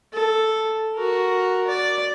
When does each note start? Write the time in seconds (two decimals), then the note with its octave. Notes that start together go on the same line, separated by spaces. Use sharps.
0.13 A4
0.95 F#4 A#4
1.67 D5